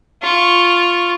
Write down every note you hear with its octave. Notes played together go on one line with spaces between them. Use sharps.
F4 C#6